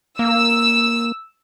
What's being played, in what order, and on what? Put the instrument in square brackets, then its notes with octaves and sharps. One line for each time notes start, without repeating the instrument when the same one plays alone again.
[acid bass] A#3 [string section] E6